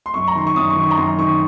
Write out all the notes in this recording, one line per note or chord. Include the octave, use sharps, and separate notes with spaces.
C6
F#2 C#6
A#5
D#3 C6
C#6
F#2 D#6
C#6
D#3
C#6
A#5
F#2 C6
D#3 C#6